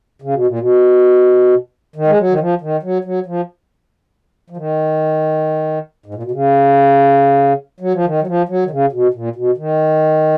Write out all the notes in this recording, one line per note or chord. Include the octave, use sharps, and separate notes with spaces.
C#3
B2
A#2
B2
D#3
G#3
F#3
D#3
F3
D#3
F#3
F#3
F3
F3
D#3
G#2
A#2
B2
C#3
F#3
F3
D#3
F#3
F3
F#3
D#3
C#3
B2
A#2
B2
D#3